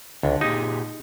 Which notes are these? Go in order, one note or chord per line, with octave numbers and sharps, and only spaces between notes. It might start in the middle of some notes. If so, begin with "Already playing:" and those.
C#2 D3
A#2 D#4 G4 G#4